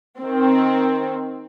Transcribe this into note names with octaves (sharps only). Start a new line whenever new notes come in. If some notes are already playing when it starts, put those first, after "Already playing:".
D#3 C4